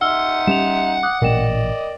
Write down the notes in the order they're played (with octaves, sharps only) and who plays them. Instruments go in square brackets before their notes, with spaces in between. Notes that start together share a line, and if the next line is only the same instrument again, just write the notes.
[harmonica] D#4 E5 C6 [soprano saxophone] F#5 [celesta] E6 F6 G7
[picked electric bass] G3 C#4 [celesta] E7 F7
[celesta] D6 D#6 F#6
[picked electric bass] A1 A#2 [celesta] A#4 G5 E7 [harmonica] D5 D#5